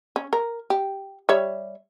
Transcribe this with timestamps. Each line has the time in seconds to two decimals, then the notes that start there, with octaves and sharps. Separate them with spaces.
0.16 C#4
0.33 A#4
0.70 G4
1.29 G3 C#5 E5